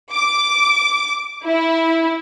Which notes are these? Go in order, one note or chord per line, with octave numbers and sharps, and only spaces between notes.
D6
E4